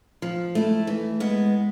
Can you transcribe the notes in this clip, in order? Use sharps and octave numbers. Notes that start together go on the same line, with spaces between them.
F3
A3 E4
E3
G#3 B3